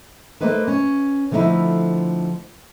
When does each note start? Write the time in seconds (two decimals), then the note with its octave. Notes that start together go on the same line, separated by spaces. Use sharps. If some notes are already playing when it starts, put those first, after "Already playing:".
0.41 A3 A#3 D#4 B4 C5
0.68 C#4
1.31 D3 F3 A3 C4 D#4 E4